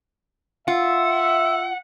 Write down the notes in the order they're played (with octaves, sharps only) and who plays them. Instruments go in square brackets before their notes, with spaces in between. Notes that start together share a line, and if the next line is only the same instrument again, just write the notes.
[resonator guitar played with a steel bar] F4 [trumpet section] E5 [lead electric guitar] F#5